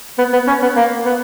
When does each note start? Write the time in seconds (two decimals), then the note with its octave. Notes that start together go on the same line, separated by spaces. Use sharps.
0.18 B3
0.33 B3
0.47 C#4
0.62 B3
0.76 A#3
1.05 B3